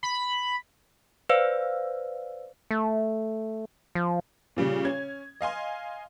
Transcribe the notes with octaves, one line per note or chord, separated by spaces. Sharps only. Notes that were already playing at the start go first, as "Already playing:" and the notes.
B5
B4 C5 D5 F5 E6
A3
F3
A#2 C#3 G3
C#4 G#6
D#5 F5 G#5 C6